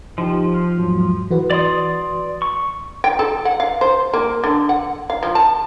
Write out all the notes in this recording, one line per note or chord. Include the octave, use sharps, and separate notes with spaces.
F3 D#4 G4
C6 F6
E2 G#2 F#3
E3 F#4 B4
D5 C6 D#6
C#6
G5
A4
F#5
F5
C5
A#3
D3
F#5
F5
F3
A5